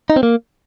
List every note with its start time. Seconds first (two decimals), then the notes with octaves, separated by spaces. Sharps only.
0.10 D#4
0.16 C4
0.23 A#3